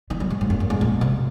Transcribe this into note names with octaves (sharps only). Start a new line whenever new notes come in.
D#3
F#3
G#2
G#2
F#2
F#2
G#2
A#2
C3